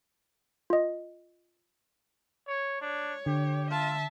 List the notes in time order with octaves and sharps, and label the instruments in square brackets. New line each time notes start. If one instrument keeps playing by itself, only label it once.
[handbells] F4 D#5
[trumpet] C#5
[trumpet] D4 [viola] C#5
[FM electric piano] D3 [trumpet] G4
[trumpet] F4 [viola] E5 A5